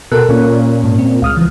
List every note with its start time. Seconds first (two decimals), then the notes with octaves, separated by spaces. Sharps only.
0.12 B2 A4 A#4 F#6
0.29 A#2 C#4
0.84 G#2
0.98 C4
1.22 C#2 F5 D#6 F6
1.36 E3 F3